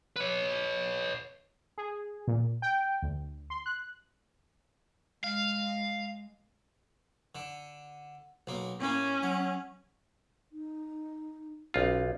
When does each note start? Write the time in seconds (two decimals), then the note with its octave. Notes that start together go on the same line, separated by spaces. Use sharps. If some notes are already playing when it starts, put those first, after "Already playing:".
0.16 B4 C#5
1.78 G#4
2.28 A#2
2.62 G5
3.02 D2
3.50 C6
3.66 F#6
5.24 G#3 F5
7.35 D3
8.47 B1 A#3
8.81 A2 A#3 C#4
9.23 F#3
10.52 D#4
11.74 B1 C#4 F4